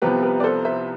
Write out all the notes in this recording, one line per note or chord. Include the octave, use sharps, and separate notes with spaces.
C2 C3 F3 B3 G4 B4
G4 B4
D5
A4 C5
C5 E5